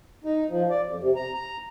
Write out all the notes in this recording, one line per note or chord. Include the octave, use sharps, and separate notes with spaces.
D#4
F3
D5
F2
C3
A#5
A#5